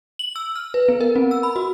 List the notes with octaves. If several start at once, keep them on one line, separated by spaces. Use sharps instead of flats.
F#7
E6
F6
B4
B3
A#4
C4
E6
B5
F#4